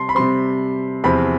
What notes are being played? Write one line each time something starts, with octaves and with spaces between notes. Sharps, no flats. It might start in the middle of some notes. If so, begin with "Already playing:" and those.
Already playing: C3 G3 A5 C6
B5
C3 G3 C4 C6
E2 C3 F3 B5